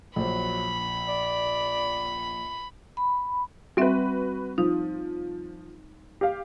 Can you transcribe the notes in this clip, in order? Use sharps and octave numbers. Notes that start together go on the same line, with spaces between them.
A#1 F#3 C5 B5
D5
B5
G3 C4 F#4 B4 E5
F3 D#4
G4 F5